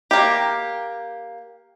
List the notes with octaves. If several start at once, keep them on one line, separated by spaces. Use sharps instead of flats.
A#3 G4